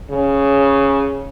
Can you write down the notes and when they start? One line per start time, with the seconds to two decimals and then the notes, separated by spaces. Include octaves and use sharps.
0.11 C#3